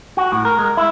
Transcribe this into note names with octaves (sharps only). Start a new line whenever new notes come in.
F#4
A2
A#4
G#3
E4